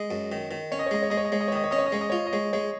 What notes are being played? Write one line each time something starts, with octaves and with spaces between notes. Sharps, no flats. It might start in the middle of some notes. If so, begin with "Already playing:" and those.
Already playing: G#3 D#5
F#2
D#3
D#3
C#4 C#5
D#5
C#5
G#3 D#5
C#5
G#3 D#5
C#5
D#5
G#3 C#5
D#5
C#5
D#3 D#5
C#5
C#4 D#5
C#5
D#5
G#3 C#5
D#5
F4 C#5
D#5
G#3 C#5
G#3 C#5